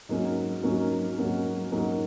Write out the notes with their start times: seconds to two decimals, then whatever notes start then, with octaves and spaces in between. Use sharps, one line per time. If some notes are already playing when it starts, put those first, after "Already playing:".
0.09 G#2 F#3 A#3 C#4 F#4
0.63 G#2 F#3 A#3 C#4 F#4
1.18 G#2 F#3 A#3 C#4 F#4
1.72 G#2 F#3 A#3 C#4 F#4